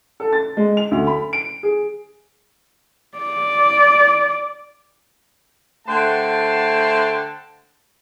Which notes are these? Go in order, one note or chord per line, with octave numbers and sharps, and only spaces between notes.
A4
A6
G#3
F7
D2
B5
D7
G#4
D5
D3 A3 C5 F#5 G5 A5